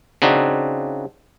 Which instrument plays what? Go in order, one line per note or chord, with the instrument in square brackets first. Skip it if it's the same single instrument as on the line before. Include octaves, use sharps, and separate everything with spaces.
[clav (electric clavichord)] C#3 C4 D4 D#4 F#4